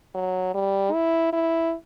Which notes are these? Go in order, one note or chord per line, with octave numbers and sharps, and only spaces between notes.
F#3
G3
E4
E4